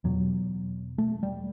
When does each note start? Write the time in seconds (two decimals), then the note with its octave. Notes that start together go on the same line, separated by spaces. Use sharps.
0.04 E2 B2 F#3
0.98 A3
1.23 G3